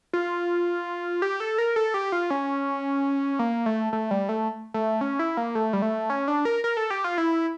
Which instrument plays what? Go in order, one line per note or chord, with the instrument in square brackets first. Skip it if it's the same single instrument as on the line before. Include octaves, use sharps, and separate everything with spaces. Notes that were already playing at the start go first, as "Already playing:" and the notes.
[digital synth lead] F4
G4
A4
A#4
A4
G4
F4
C#4
A#3
A3
A3
G3
A3
A3
C#4
E4
A#3
A3
G3
A3
C#4
D4
A#4
A#4
A4
G4
F4
E4